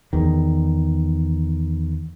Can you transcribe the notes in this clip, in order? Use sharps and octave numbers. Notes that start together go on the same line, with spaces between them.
E2 D#3